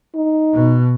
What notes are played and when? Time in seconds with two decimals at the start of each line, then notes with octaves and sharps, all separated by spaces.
0.15 D#4
0.54 B2